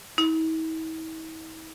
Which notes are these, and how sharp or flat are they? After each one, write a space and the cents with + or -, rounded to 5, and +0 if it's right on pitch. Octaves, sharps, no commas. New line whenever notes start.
E4 -45